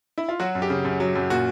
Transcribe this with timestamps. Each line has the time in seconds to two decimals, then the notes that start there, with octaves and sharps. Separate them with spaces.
0.18 E4
0.29 F4
0.40 F#3 F#4
0.55 F#2
0.62 G4
0.70 C#3
0.85 F#2
1.00 F#3
1.15 F#2
1.30 A#2 F#4